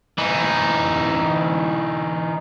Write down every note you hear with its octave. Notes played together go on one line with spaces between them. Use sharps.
E3 D#4